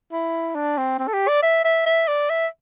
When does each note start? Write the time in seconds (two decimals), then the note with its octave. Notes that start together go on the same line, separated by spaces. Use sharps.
0.12 E4
0.55 D4
0.78 C4
0.99 C4
1.08 A4
1.14 G4
1.28 D5
1.43 E5
1.64 E5
1.86 E5
2.08 D5
2.30 E5